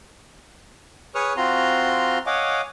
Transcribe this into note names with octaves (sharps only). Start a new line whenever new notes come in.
G#4 B4 C#5 C#6 D#6 F6
C4 F4 F#4 A#5 C6
C#5 D#5 F5 F#5 G#5 D6